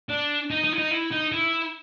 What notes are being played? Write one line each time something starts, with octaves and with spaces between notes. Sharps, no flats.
D4
D#4
D#4
E4
D#4
E4
D#4
E4